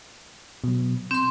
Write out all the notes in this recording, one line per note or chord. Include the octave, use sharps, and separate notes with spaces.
B2 F#3
C4 C6 G6